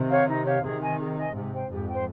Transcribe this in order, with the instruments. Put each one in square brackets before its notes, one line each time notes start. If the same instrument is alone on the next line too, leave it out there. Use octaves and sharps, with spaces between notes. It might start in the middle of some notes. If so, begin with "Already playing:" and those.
Already playing: [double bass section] C3 D#3
[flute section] G4 C#5 F5
D#4
G4 C#5 F5
[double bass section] C3 D#3 [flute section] G#4
[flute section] D#5 G#5
G#4
D#5 G#5
[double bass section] G#2 C3 [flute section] G4
[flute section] C5 G5
[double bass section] F2 G#2 [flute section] G4
[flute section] C5 G5